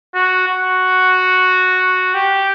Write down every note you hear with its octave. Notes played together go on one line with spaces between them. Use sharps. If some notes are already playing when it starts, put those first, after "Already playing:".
F#4
F#4
G4